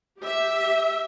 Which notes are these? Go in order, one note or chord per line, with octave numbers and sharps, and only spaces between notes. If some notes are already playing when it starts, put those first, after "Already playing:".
G4 E5